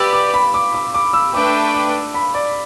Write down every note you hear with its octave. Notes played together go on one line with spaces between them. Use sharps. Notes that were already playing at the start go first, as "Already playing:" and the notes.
Already playing: G4 B4 D5 E6
D6
B5
D6
D6
D6
E6
A3 D4 B4 G5 D6
D6
B5
D5